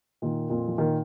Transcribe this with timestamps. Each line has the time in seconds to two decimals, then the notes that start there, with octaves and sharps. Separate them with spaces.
0.22 A#2 D#3
0.50 F2 A#2
0.68 F3
0.78 A#2 D#3